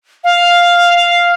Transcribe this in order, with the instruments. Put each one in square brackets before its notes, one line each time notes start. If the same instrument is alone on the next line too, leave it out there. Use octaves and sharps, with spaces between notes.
[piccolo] F5